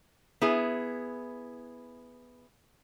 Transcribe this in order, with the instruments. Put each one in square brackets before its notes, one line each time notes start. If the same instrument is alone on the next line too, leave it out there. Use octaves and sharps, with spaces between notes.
[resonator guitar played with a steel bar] B3 E4 G#4